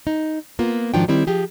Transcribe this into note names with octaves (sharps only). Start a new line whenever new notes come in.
D#4
A#3 B3 F4
G#2 D#3 F3 F#3 D4 G5
D#3 G3 C4 E4
F3 G4 G#4